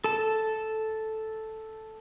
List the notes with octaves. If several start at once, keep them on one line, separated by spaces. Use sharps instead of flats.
A4 A5